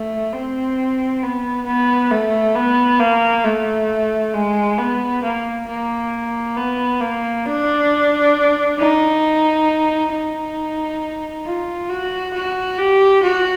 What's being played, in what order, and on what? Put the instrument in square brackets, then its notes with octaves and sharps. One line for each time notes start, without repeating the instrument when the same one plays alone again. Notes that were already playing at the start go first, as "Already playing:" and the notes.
Already playing: [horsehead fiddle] A3
C4
B3
B3
A3
B3
A#3
A3
G#3
B3
A#3
A#3
B3
A#3
D4
D#4
D#4
F4
F#4
F#4
G4
F#4